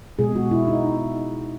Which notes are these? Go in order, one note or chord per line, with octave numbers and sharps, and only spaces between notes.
B2 G#3 G#4
F#4
E4
D#4